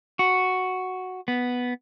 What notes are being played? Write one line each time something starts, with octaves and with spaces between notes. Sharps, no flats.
F#4
B3